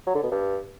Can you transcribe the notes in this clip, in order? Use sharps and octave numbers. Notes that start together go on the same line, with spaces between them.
F#3
D3
B2
G2